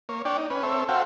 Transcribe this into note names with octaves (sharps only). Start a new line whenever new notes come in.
A#3 C#5
D4 C#5 D5 G5
D#4
C#4 B4
C4 A4 C#5 E5
F#4 A4 C5 E5 F5 G5